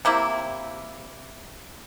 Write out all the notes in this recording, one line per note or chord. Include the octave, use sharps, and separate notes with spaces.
C3 A#3 C4 E4